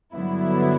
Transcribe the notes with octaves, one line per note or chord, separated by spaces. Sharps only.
G2 D3 F#3 B3 E4